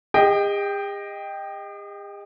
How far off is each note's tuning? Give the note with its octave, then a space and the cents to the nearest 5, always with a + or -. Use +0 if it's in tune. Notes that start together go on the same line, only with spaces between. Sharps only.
G#4 -45 D#5 +0 G5 +5